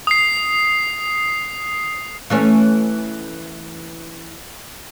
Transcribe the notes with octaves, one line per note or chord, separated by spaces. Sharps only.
D#6 C7
E3 A3 C#4